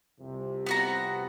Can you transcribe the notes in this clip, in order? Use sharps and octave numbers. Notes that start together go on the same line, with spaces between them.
C2 F2 C3
B3 F#4 A#5